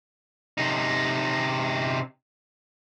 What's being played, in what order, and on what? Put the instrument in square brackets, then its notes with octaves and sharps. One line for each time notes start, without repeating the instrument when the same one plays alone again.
[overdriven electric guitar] C3 D#4